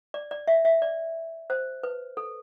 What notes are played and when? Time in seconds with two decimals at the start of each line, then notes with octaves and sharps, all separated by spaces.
0.14 D5
0.31 D5
0.48 E5
0.65 E5
0.82 D5
1.50 C5
1.83 B4
2.17 A4